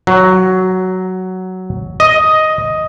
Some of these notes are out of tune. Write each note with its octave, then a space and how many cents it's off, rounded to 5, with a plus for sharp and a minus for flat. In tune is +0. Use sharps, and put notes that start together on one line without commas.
F#3 +5
D#5 +5